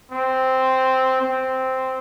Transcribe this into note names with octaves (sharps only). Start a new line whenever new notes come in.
C4
C4